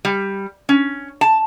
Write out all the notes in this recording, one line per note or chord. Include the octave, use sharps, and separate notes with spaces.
G3
C#4
A5